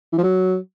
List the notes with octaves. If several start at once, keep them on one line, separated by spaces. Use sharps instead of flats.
E3
F3
F#3